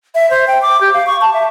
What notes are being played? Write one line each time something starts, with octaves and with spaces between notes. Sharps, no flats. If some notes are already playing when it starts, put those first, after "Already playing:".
E5
C5
G5
D6
G4
F5
C#6
A5
E5